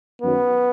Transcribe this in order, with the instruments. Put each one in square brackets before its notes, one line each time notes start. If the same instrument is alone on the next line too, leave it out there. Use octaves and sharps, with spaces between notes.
[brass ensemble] F#2 D#3 F#3 B3